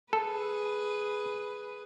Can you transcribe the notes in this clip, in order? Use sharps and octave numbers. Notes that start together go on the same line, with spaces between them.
G#4 A4 B4